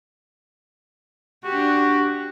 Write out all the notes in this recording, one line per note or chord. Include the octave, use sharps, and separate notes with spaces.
D4 F#4 G4